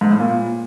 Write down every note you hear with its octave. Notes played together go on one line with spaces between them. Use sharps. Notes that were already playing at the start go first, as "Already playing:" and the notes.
G#2
A2
A#2